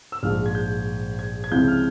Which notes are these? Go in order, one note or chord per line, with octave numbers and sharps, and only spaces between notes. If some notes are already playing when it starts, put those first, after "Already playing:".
E6
A#1 G#2 F3 F6
G#6
G6
G#6
G#6
C#2 C3 F3 C4 E4 G6
F6